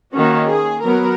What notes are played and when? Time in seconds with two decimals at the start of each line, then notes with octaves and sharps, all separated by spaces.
0.15 D#3 A#3 C#4 F#4
0.50 G#4
0.84 F#3 B3 A#4